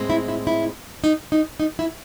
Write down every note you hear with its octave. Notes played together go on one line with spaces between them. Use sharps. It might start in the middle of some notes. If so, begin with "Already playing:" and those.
Already playing: A2 G#3 C4
E4
E4
E4
D#4
D#4
D#4
E4